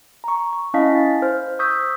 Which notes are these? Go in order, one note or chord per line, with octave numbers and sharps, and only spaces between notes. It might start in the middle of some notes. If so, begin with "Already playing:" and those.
A#5 C#6
C#6
C#4 E4 D#5 F5 A5 B6
E4 A6
C5 F6
C#6 D#6 E6 G6 B6